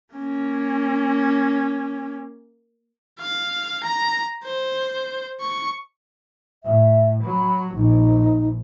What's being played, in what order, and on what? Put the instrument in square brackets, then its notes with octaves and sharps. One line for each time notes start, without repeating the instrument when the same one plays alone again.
[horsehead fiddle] A#3 C#4
[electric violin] F5
A#5
C5
C#6
[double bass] A2 [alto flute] E5
[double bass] F#3 [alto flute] B5
[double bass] A#1 [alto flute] D#4